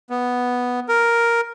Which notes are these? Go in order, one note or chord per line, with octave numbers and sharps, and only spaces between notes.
B3
A#4